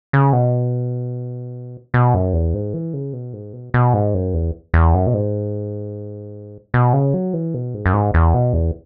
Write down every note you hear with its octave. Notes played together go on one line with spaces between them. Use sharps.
C#3
B2
B2
F#2
E2
G#2
E3
C#3
B2
G#2
B2
B2
G#2
F#2
E2
E2
F#2
B2
G#2
B2
C#3
F#3
E3
B2
G#2
F#2
G#2
E2
B2
E2